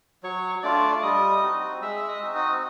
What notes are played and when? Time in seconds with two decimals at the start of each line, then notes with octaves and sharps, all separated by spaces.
0.23 F#3 C#5 C#6
0.63 A3 D4 F4 D5 D6
1.02 G3 D#5 D#6
1.42 C4 D#4 F#4
1.81 G#3 E5 E6
1.97 E6
2.08 D#5 D#6
2.21 C4 D#4 F#4
2.35 D#5 D#6